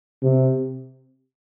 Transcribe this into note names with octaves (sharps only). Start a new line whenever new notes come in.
C3